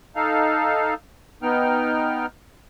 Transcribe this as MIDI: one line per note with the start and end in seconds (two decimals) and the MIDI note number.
0.16 0.94 63
0.16 0.94 69
0.16 0.94 77
1.43 2.26 59
1.43 2.26 63
1.43 2.26 79
1.43 2.26 89